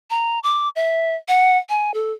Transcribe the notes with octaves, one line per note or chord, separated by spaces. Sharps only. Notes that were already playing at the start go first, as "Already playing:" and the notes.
A#5
D6
E5
F#5
G#5
A4